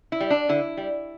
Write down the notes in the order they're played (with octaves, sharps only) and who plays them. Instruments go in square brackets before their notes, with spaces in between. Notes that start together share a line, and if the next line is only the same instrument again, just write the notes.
[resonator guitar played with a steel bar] E4
G3
D4
D3 E4
G3